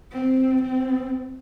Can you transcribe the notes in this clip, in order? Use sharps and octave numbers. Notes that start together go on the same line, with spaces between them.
C4
C4